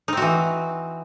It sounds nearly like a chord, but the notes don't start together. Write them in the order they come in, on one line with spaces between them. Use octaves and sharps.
D#4 C4 F#4 E3